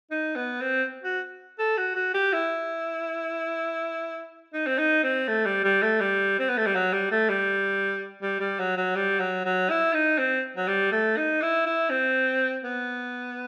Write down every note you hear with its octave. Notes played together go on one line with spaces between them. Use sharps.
D#4
B3
C4
F#4
A4
F#4
F#4
G4
E4
D#4
C4
D#4
C4
A3
G3
G3
A3
G3
C4
B3
A3
G3
F#3
G3
A3
G3
G3
G3
F#3
F#3
G3
F#3
F#3
E4
D#4
C4
F#3
G3
A3
D#4
E4
E4
C4
B3